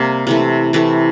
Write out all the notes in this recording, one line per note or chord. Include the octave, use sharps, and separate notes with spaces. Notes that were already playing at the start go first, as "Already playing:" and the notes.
Already playing: C3 G3 A#3
C3 E3 A3
C3 E3 A3